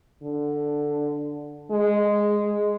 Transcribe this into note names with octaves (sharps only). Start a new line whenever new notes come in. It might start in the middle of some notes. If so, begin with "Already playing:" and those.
D3
G#3